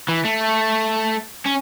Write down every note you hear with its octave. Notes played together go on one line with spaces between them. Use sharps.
E3
A3
C#4